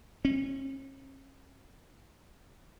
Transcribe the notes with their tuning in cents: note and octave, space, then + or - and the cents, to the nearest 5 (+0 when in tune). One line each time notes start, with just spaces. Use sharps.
C#4 -40